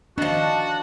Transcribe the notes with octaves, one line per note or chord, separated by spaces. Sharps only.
D#3 F3 D4 F#4 D#5 A5